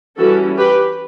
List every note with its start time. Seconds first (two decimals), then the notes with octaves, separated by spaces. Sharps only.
0.17 E3 G3 C#4 F#4 A4
0.57 G4 B4